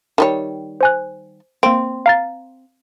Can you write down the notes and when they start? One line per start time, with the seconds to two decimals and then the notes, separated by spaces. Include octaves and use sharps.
0.18 D#3 G3 C#5
0.81 C5 G#5 F#6
1.63 A#3 C4 D7
2.06 F5 A#5 A6